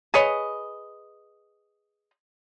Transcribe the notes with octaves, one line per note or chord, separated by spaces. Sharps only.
G#4 B4 C#5 D#5